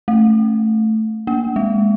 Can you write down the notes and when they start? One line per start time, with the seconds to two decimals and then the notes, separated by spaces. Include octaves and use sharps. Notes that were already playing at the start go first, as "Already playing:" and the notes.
0.08 A3
1.27 A#3
1.56 G#3